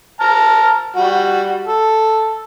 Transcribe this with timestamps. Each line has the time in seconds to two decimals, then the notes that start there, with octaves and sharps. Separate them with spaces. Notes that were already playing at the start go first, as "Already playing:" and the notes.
0.20 A5 A#5 F6
0.96 G3 F#4
1.67 A4